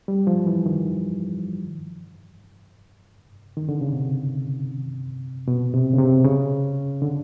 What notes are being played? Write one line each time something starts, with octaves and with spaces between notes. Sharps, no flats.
G3
F3
E3
D#3
D#3
D3
C#3
C3
B2
C3
C#3
C3
C#3
D3